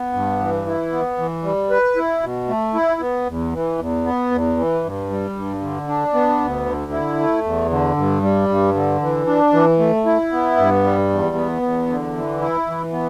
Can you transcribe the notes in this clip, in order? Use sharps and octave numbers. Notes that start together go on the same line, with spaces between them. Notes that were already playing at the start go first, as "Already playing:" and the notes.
Already playing: B3
G2
E3
E4
B3
E3
G3
B4
E4
B2
A3
E4
B3
E2
E3
E2
B3
E2
E3
G2
G3
G2
D3
D4
B3
D2
D3
E4
A3
E2
D3
G2
G3
G2
D3
E3
D4
E3
A3
E4
B3
G2
G3
E2
B3
E2
D3
E3
E4
E3
B3